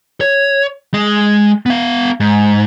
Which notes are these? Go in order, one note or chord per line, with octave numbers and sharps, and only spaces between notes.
C#5
G#3 G#4
B3 F5
G#2